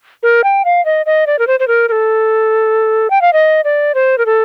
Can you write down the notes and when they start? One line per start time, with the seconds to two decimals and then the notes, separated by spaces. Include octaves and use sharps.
0.23 A#4
0.44 G5
0.65 F5
0.85 D#5
1.06 D#5
1.27 D5
1.39 A#4
1.47 C5
1.60 C5
1.68 A#4
1.89 A#4
1.92 A4
3.10 G5
3.21 F5
3.33 D#5
3.64 D5
3.95 C5
4.18 A#4
4.26 A4